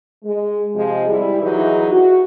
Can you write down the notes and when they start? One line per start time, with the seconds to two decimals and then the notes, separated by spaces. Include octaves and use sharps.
0.24 G#3
0.75 C3 F3 G#3
1.09 G3 E4 G4
1.41 D#3 E3 F#3 D#4 E4 G#4
1.91 F#4